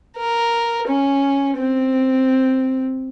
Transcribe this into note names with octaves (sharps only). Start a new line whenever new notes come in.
A#4
C#4
C4